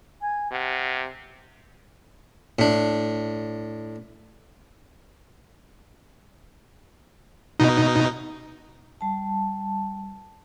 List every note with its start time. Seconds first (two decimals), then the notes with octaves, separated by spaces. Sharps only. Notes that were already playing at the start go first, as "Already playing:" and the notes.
0.21 G#5
0.52 C3 F#5
2.59 A2 D4
7.60 B2 D#4
9.01 G3 A5